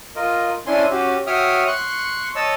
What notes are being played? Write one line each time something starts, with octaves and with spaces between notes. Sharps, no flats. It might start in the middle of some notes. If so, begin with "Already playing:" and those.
F4 A#4 D#5
C#4 D4 E4 G#5 C6
C#4 F#4 G4
F#4 C#5 E5 G5 D#6 F6
C6 C#6 F#6
C#5 D#5 A5 E6